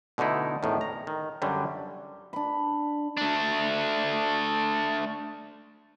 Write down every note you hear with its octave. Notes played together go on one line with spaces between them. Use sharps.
B2 D3 A3 D#4 E4
E2 A2 D#3
A#5
D#3
F#2 D3 F#3 G3
D4 B5
A3 D4